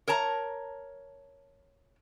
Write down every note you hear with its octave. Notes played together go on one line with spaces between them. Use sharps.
A#4 C#5 A5 A#5